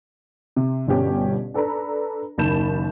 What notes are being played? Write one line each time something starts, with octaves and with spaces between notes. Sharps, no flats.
C3
G1 G2 B2 C#4 G4
D4 A4 B4 A#5 B5
F#1 D#2 A5 B5 G6 E7